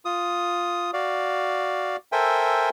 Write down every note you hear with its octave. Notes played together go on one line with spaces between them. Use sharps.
F4 D#6
F#4 D5 F5
A4 A#4 C5 E5 G5 G#5